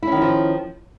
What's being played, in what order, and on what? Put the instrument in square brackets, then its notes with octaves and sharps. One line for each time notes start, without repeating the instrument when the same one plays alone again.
[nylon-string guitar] E4
C#4
D#3
F#3
F3